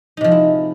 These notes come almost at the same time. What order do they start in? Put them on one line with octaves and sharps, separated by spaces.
D#4 C3 F3 G#3 E4